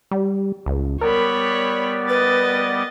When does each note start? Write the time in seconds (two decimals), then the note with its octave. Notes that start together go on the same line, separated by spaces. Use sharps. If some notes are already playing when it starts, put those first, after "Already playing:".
0.11 G3
0.66 C#2
1.01 G3 B3 A#4 C#5 D5 B5
2.09 B4 D#5 A6